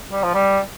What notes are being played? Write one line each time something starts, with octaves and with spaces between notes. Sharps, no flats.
G3
F3
G3